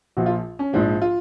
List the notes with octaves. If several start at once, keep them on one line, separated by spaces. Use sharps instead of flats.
A#1 A#2 F3 F#4
F4
C#4
A#1 G#2 F3 D4
F4